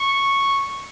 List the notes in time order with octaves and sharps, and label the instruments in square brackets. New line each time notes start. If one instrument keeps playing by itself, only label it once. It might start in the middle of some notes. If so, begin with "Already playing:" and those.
Already playing: [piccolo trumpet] C#6